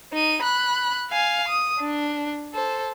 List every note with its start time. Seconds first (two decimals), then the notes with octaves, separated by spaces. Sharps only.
0.13 D#4 D#7
0.43 B5 F#6
1.11 F5 G#5
1.48 D#6
1.80 D4
2.54 A4 C5